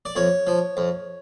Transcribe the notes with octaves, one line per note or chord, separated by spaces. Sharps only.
D5
F2 C#5
F3
F2